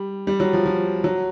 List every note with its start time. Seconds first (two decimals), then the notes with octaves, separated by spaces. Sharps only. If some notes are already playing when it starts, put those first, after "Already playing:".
Already playing: G3
0.27 G3
0.40 F#3
0.53 F3
0.66 F3
1.04 F#3